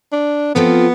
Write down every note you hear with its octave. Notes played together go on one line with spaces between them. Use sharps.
D4
F3 B3 C4 F4 A4 C5